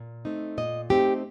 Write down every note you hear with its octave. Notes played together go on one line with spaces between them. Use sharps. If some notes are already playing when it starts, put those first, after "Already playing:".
Already playing: A#2
A3 C4 D#4
A#2 D#5
A3 C4 D#4 G4